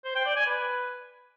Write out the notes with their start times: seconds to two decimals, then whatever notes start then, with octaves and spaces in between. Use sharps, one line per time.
0.05 C5
0.15 G5
0.26 D5
0.36 G#5
0.47 B4